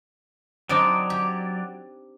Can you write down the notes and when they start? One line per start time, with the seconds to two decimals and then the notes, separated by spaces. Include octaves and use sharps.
0.69 F#3 C4 D4 D#4 D5
1.10 G4